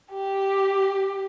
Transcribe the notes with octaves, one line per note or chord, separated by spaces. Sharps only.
G4